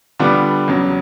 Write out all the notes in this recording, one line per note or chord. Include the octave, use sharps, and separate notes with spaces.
D3 G3 B3 D4 F4
E2 C#3 F#3